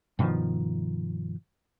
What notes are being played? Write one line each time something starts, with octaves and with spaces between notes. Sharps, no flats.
G2 B2 D#3 F3